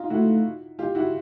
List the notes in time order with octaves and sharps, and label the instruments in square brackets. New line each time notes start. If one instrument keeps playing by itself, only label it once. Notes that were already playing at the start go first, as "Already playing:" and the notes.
Already playing: [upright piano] D#4 F4
[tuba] A3 [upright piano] E4 F#4
[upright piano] F4 G4
E4 F#4